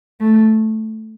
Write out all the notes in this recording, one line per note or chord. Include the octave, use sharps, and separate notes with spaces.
A3